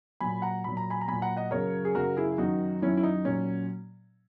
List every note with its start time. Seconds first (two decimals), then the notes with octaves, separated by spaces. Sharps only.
0.20 A#2 F#3 G#5 B5
0.42 F#5 A#5
0.64 A#2 F#3 B5
0.77 A#5
0.90 G#5 B5
1.01 A#5
1.08 A#2 F#3 G#5 B5
1.22 F#5 A#5
1.37 D#5 F#5
1.51 F#2 C#3 F#3 A#4 C#5
1.85 G#4
1.95 F#2 C#3 F#3 F#4 A#4
2.17 E4 G#4
2.38 F#2 D#3 F#3 D#4 F#4
2.82 F#2 D#3 F#3 C#4 E4
2.97 E4
3.03 D#4
3.25 A#2 F#3 C#4